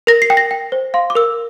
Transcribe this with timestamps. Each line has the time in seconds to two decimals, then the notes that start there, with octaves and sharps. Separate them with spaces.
0.07 A#4 A#6
0.22 C7
0.30 G5
0.37 A#6
0.51 G5
0.72 C5
0.94 F5 C6
1.10 D6
1.15 A#4 E6